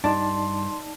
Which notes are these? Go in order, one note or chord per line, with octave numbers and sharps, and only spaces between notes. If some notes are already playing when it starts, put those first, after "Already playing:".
G2 D4 D#4 D5 A5 C6